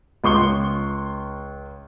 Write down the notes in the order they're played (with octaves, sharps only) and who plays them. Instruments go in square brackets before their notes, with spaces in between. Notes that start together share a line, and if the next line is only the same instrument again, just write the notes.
[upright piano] C#2 C6 C#6 G7